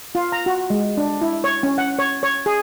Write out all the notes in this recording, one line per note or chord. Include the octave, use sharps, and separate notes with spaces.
F4
A#5
F#4
G#3
D4
E4
C#5
C#4
F#5
C#5
C#5
G#4